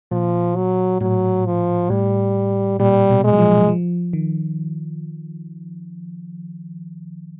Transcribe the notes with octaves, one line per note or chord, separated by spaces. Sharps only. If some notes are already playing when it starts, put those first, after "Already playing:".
A#2 F3
F#3
A2 F#3
F3
A2 G3
A#2 G3
B2
G#3
F#3
F3
F3
D#3